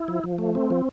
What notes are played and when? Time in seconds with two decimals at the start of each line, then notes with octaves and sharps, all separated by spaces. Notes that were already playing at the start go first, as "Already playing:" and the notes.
Already playing: E4
0.08 F3
0.24 F3
0.38 A3
0.55 C4
0.70 F3